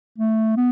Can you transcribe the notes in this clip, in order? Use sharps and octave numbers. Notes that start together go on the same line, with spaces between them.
A3
B3